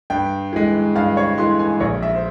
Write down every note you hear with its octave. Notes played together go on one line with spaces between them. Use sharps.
G2 G5
E3 G#3
G2 F5
C#5
E3 G#3 C6
G#5
A#1 C#5
E5
C5